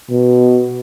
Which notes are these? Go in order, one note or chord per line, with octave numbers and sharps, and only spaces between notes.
B2